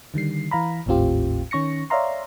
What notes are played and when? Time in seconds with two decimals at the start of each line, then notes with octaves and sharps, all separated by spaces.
0.14 D3 D#3 G3 C7
0.51 E3 F5 A#5 B5
0.86 G#1 D#2 A2 C4 F4 G4
1.51 D#3 C#4 C#6 A#6 C#7
1.90 C#5 D5 E5 F5 A#5 C6